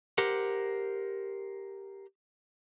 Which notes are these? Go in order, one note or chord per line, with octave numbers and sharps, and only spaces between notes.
G4 A#4 C5 F#5